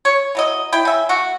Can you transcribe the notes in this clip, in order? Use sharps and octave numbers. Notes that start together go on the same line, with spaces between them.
C#5
E3 F#3 D#5
E4 G5
C#3 E5
A3 F#4